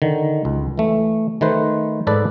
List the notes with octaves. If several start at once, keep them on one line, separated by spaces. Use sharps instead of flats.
D3 D#3
C#2
E3 A3
D#3 A3 B4 C5
G#2 A4 B4 D5 A5